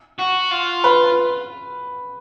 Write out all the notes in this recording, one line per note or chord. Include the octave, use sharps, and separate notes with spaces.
F#4
F4
B4